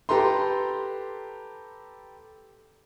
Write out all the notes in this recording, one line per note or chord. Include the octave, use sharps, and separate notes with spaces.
G4 A4 B4 A#5 C6